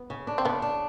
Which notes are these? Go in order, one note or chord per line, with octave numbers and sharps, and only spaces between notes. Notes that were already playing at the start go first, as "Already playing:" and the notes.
Already playing: B3
C#3
D4
C4
C#3 B3
D4